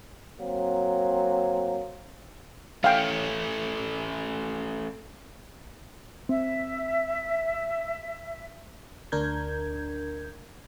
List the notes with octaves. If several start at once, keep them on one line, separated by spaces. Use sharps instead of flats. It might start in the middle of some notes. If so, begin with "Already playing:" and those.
F#3 A#3 C4
A3 C#4 F5 G5
C4 E5
D2 D4 A#4 G6 G#6